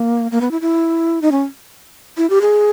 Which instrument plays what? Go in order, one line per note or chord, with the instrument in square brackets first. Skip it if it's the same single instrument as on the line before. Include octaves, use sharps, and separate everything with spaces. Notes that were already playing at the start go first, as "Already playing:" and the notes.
Already playing: [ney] A#3
A#3
B3
E4
E4
D#4
C#4
E4
G4
G#4